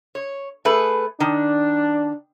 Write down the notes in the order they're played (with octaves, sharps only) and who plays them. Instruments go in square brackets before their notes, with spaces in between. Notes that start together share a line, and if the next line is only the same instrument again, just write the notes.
[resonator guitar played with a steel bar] C#5
A3 G#4 B4
[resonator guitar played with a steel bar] D#3 [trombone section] D4